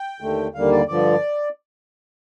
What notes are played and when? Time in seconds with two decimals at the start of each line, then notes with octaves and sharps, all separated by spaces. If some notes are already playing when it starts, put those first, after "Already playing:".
Already playing: G5
0.20 D#2 D3 A3
0.54 D#2 D3 G3 A#3 F5
0.72 D5
0.88 G2 D3 F3 D5